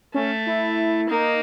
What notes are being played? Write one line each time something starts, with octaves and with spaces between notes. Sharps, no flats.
A3 C#4
E4
A#3 D#4